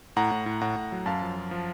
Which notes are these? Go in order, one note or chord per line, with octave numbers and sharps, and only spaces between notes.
A2 F#5 A#5
A2
A2
A2 F#5 A#5
A2
F#3
F#2 F5 A5
F3
F3
F3